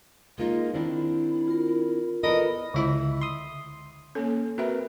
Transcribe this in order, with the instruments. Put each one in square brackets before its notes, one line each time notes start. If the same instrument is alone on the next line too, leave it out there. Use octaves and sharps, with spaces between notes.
[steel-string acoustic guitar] G#3 A#3 D#4 [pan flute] F4
[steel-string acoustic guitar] D#3 C4 D4 [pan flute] E4
[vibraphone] F4 A#4
[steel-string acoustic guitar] B3 A4 A#4 [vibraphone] F4 D5 B5 [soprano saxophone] D#5
[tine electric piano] C#2 E5 B5 [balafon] D3 E4 D#5
[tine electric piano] C6 D#6
[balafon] A#3 A4 [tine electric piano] C#4
[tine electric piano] C4 A#4 B4 [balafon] F#4 E5